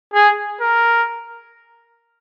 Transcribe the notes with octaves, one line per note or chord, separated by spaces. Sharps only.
G#4
A#4